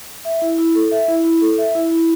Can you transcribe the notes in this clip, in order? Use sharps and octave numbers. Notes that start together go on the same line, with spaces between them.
E5
E4
E4
A4
E5
E4
E4
A4
E5
E4
E4